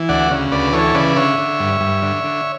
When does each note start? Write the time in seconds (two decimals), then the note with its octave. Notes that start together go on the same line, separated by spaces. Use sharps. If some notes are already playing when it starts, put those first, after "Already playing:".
Already playing: E3
0.09 D2 D5 F#5
0.30 C#3
0.52 D2 B4 D5
0.73 E3 A4 C#5
0.95 C#3 B4 D5
1.16 D3 C#5 E5
1.38 D3
1.60 G2
1.81 G2
2.02 D3
2.24 D3